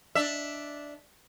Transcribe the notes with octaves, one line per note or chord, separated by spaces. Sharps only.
D4 E5